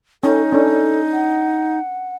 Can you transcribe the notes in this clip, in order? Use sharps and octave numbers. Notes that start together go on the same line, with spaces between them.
C#4 D#4 A4
C#4 D4 A4
F#5